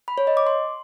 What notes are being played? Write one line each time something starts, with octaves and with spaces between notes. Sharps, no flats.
B5
C#5
D#5
D6
C6